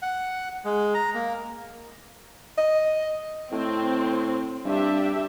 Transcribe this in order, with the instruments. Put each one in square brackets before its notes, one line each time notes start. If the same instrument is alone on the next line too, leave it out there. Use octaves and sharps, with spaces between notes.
[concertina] F#5
G#3
A#5
A#3
[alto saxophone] D#5
[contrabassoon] A2 [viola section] C4
[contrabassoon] G2 [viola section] D4 G4 E5